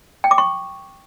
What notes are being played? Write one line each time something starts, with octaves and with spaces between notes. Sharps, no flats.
G5
D6
C#6